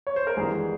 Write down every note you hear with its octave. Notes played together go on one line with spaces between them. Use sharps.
C#5
C5
A#4
G#1 G#2 E3 G3 G#4